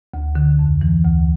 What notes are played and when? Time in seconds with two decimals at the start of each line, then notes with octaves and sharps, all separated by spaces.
0.14 D2
0.35 D3
0.59 F2
0.81 E3
1.05 D2